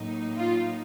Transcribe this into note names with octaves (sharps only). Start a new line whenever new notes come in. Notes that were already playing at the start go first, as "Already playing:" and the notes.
Already playing: A2 F#3 A#3 D#4
F4